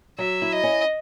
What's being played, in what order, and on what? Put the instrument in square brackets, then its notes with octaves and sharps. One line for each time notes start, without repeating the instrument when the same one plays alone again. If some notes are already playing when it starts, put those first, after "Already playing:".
[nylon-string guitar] F#3 [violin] E5
[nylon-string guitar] E4
[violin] D#5
[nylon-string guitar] C#4